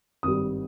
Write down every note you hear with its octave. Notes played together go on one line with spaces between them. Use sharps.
G#1 G2 G3 D#6